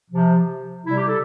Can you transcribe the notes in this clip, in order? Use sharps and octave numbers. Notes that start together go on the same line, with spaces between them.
C3 F3
C3 G3 E4
G4
A4